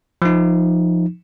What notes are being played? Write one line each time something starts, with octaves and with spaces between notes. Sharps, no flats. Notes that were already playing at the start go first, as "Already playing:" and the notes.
F3 D#4